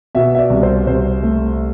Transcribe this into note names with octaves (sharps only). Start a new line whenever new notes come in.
B2 E5
E5
D5
C2
C5
C2 C5
A3